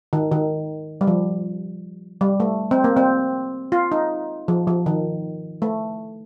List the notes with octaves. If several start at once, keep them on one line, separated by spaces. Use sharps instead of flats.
D#3
D#3
G3
F3
G3
A3
C4
A#3
C4
F4
D#4
F3
F3
D#3
A3